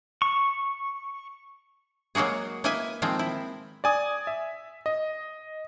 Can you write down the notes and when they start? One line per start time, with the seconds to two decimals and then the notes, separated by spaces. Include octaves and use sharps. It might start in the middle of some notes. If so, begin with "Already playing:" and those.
0.22 C#6
2.15 F#3 G#3 A#3 F#4 G#4
2.64 A#3 E4 B4 D#5 E5 G#5
3.02 D#3 F3 G#3 C4
3.19 E4
3.84 D5 G#5 D#6
4.27 E5
4.86 D#5